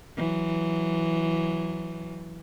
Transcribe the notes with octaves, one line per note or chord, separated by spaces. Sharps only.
E3 F#3